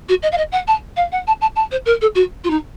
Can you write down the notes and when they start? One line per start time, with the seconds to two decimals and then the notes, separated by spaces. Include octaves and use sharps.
0.08 F#4
0.22 D#5
0.32 F5
0.37 D#5
0.52 F#5
0.67 A5
0.96 F5
1.12 F#5
1.27 A5
1.41 A5
1.55 A5
1.71 C5
1.85 A#4
2.01 A4
2.15 F#4
2.44 F4
2.50 D#4